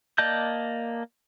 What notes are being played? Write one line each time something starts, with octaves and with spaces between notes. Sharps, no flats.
A#3 D5 D#5 A5 G6